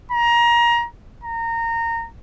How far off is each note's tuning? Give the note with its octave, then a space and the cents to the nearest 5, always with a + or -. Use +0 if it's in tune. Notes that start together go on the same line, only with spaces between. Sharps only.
A#5 +25
A#5 -20